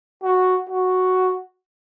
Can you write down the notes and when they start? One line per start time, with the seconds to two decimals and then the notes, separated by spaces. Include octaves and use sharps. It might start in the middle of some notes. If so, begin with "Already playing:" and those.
0.23 F#4
0.70 F#4